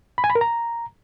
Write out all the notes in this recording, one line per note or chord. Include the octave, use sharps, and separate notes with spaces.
B5
G#5
B5
A#4
A#5